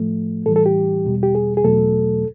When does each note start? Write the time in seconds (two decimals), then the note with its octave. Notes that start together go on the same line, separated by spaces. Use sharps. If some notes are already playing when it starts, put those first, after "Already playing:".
Already playing: A2 F3 A3
0.46 A2 E3 G3 A4
0.56 A4
0.66 G4
1.05 E2 B2 G3
1.23 G4
1.35 G#4
1.57 G#4
1.64 E2 B2 F#3 A3 A4